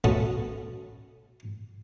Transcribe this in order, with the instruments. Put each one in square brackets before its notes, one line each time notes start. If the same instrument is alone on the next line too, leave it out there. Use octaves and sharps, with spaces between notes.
[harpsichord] A3 B3 C#4 F#4